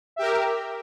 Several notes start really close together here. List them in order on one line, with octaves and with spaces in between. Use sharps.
E5 G4 A#4